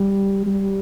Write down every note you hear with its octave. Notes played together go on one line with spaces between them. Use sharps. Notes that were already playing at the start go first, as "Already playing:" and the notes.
Already playing: G3
G3